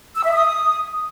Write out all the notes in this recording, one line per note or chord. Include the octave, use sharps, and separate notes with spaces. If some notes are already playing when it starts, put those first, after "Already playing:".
E6
E5
D#6